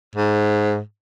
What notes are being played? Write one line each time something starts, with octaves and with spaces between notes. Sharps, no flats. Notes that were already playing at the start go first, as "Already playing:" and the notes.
G#2